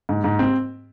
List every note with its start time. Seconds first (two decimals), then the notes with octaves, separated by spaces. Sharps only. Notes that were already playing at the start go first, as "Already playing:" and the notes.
0.09 G#2
0.24 G#2
0.39 C4